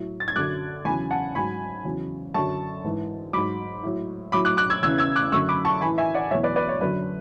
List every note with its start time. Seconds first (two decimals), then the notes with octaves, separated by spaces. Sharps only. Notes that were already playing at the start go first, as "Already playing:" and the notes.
Already playing: A2 F#3
0.20 A6
0.28 G#6
0.36 F#2 D3 F#3 D6 F#6
0.85 E2 C#3 F#3 G#5 B5
1.11 F#5 A5
1.35 G#2 F#3 G#5 B5
1.85 E2 C#3 F#3
2.34 F#2 D3 F#3 A5 C#6
2.84 G#2 E3
3.33 G#2 F#3 B5 D6
3.83 A2 F#3
4.32 A2 F#3 B5 D6
4.45 D6 F#6
4.57 D6 F#6
4.70 E6 G#6
4.83 E2 C#3 E3 E6 G#6
4.98 E6 G#6
5.16 D6 F#6
5.32 F#2 D3 F#3 C#6 E6
5.49 B5 D6
5.65 A5 C#6
5.81 E3 G#5 B5
5.85 A2
5.98 E5 G#5
6.14 D5 F#5
6.31 E2 B2 F#3 C#5 E5
6.43 B4 D5
6.56 B4 D5
6.69 C#5
6.81 F#2 D3 F#3 B4